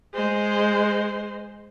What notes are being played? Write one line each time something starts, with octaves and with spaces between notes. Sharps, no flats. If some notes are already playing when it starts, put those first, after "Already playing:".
G#3 C5